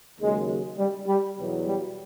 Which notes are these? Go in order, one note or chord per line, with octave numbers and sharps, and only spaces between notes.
D#2 C#3 F#3 G#3
G3
G3
E2 B2 F#3
G3